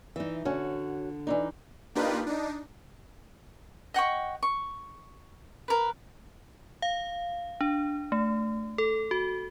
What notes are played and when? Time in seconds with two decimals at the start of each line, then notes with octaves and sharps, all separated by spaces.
0.16 E3 D#4 E5
0.45 D3 C#4 F#4
1.27 E3 D4 D#4
1.95 A#3 D4 D#4 F4 G4 B4
2.27 D4 D#4
3.94 D#5 F#5 G5 C#6
4.43 C#6
5.68 A#4 B4
6.82 F5
7.61 D4
8.12 A3
8.78 A4
9.11 F#4